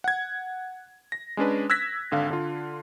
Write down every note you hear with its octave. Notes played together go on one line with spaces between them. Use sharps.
F#5 G#6
A#6
G#3 C#4 D4 B4
E6 F#6 G#6 A#6 B6
G#1 D3 F5
D3 F4